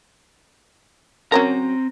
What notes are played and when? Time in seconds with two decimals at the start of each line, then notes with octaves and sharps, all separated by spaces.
1.32 F#3 C4 C#4 A#4 A#5